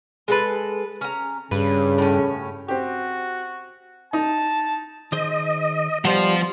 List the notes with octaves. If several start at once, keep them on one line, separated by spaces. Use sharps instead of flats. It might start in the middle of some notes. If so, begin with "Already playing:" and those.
G#3 A4 B4
C#4 A#5
G2 C#3 B4
A2 C#4
C4 F#4 G4
D#4 A5
D#3 G#4 C5 D#5
F3 G3 B3 G4 C5 F#5